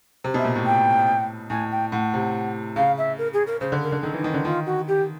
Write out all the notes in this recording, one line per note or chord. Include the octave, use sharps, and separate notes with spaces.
C3
B2 E5
A#2
A2
G5
A2 G#5
G5
A2 F#5
C3
C#3 F5
E5
A#4
G#4
A#4
C#3 C5
D3
A#4
D3
D#3 A4
E3 D#4
D#3
D3 C#4
D#3 F4
F#4
G4